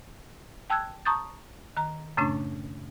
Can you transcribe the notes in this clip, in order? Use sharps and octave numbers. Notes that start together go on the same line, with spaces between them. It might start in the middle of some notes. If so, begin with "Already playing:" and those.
G5 A5 E6 F#6 G#6
A5 A#5 C#6 D#6 G6 A6
D#3 A#5
F#2 A2 C#3 A3 C#4 D4